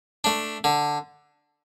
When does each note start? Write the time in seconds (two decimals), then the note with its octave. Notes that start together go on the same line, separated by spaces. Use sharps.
0.24 A3 D4
0.64 D3